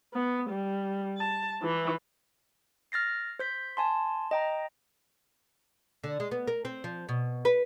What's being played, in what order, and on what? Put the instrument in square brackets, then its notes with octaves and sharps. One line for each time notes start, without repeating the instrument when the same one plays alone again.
[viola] B3
G3
A5
E3
[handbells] F6 A6 A#6 C7
C5 G6 B6
G#5 A5 C6
D#5 G5 A#5
[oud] D3
G#3
B3
A#4
C4
F3
B2
B4